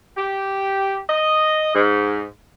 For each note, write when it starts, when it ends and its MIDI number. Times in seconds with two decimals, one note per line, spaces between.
0.16 0.99 67
1.09 1.72 75
1.75 2.25 44